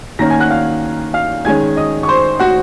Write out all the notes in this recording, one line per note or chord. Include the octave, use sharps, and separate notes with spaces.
D#3 A#3 C#4 A#5 A#6
G#5 G#6
F#5 F#6
F5 F6
F5 F6
D#3 G#3 C#4 G#5 G#6
D#5 D#6
C#6
C5 C6
F#4 F#5